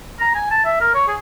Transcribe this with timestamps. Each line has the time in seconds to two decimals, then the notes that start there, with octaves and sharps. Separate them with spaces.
0.19 A#5
0.35 G#5
0.51 A5
0.65 E5
0.80 A#4
0.94 C#5
1.07 G#4